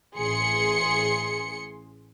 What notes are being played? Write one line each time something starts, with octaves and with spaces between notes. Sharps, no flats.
A1 G#4 C6 C#7